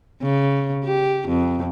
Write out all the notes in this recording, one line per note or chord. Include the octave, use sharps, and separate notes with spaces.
C#3
G4
F2